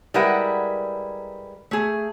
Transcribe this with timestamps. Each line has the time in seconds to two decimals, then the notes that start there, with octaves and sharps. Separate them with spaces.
0.14 G3 G#3 E4 A#4 B4 F#5
1.71 A3 G#4